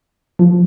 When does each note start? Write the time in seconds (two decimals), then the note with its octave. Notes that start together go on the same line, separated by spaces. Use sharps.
0.39 F3